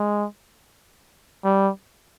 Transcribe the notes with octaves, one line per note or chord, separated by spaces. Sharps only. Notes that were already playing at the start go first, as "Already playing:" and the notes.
Already playing: G#3
G3